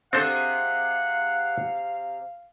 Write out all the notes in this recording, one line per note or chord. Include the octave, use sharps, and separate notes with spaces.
C3 C4 D4 G#4 A4 C5 F5 F#5